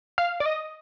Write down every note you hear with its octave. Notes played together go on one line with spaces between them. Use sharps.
F5
D5
D#5